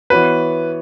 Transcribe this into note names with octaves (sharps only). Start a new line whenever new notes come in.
E3 B3 F#4 B4 C#5